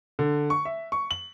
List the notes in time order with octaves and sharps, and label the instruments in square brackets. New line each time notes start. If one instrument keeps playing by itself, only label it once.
[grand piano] D3
C#6
E5
C#6
F#7